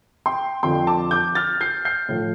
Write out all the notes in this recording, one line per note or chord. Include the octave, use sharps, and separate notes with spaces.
G5 C6
F2 D3 F3 G5 C6
A5 D6
D6 G6
F6 A6
G6 C7
G6 C7
A2 F3